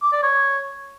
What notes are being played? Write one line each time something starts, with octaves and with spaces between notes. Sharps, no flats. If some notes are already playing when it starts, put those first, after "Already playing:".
D6
D5
C#5